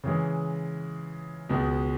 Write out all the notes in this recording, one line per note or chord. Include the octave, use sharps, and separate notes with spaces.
C#3 E3 G#3
C#2 B2 G#3